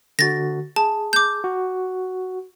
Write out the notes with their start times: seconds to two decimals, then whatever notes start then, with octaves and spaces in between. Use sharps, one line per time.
0.19 D3 F#4 A6 A#6
0.76 G#4 A5
1.13 D6 G6
1.44 F#4